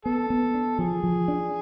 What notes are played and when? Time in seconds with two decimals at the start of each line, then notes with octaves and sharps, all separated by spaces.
0.05 B3 A4
0.30 B3
0.54 D4
0.79 F3 G#4
1.04 F3
1.28 D4